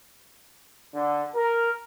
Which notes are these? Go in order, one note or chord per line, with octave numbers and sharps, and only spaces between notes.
D3
A#4